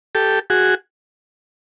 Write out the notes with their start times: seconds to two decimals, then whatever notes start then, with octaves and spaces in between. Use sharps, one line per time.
0.15 G4 A4
0.50 F#4 G#4